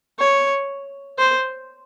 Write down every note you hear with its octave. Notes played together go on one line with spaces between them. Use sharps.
C#5
C5